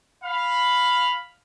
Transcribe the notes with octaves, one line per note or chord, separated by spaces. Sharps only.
F5 B5